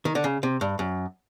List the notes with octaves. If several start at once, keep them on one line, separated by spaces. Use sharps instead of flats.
D#3
D3
C#3
C3
G2
F#2